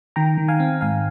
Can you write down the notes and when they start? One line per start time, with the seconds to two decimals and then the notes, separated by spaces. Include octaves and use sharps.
0.16 D#3 G5 A#5
0.38 D#3
0.48 F5 G#5
0.60 C4
0.81 G#2 F5 G#5